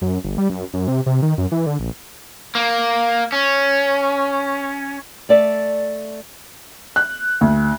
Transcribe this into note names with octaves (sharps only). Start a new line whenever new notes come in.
F#2
G1
G3
F#2
F#2
C3
C3
D#3
F#2
E3
D3
A#1
A#3
C#4
A3 D5 E5
F#6
D2